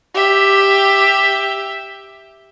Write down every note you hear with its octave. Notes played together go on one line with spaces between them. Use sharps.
G4 E5